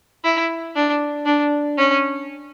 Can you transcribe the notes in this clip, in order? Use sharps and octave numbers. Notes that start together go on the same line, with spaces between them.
E4
D4
D4
C#4